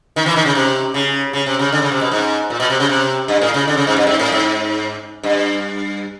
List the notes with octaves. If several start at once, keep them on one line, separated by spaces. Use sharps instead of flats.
D#3
E3
D#3
C#3
C3
C#3
C#3
C3
C#3
D3
C#3
C3
B2
G#2
A#2
B2
C3
C#3
C3
G2
A2
C#3
D3
C#3
G#2
G2
G#2
A2
G#2
G2